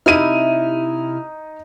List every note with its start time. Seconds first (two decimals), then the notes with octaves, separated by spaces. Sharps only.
0.06 C3 D#4 E4 F6 D#7